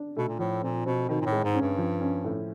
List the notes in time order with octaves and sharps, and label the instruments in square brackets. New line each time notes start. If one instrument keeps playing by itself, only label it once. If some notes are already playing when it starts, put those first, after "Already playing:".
Already playing: [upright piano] D4
[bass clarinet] B2 [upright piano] A3
[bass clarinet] A#2
[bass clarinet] A2 [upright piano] F3
[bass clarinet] A#2 [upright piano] C4
[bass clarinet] B2 [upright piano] C4
[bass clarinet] B2 [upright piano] D#3
[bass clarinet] A#2
A2
[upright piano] G#3
[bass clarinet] G#2
[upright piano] C#4
[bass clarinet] G2
[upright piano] F3
C#4
A2